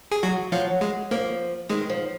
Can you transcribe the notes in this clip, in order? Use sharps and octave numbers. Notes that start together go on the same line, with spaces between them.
G#4
F#3 F#4
F3 F#3 F4
G#3
F3 A#3
D#3 G#3
F3